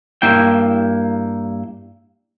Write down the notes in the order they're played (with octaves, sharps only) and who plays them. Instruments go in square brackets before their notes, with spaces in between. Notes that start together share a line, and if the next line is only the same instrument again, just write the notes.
[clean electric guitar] G2 A#3 E4 G5